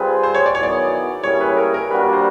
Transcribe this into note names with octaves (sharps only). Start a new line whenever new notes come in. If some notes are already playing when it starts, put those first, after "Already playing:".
Already playing: G3 C4 F4 G#4 B4
C5
C#5
D5
D#3 F#3 B3 E4 G#4 C#5
D5
G3 A#3 C#4 E4 G#4 C#5
B4
A#4
A#4
G3 A#3 D4 F#4 B4
A#4
C5